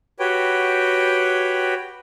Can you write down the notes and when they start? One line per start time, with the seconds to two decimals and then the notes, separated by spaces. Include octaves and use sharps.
0.20 F#4 G4 B4 C#5 G5